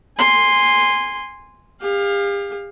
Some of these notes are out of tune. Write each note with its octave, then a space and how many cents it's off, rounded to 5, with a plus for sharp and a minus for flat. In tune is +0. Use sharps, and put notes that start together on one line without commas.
G#5 -15 C6 +0
G4 +45 F5 +10